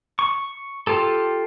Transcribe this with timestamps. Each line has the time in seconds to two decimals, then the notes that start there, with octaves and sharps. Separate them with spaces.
0.19 C#6
0.87 F4 G4 A4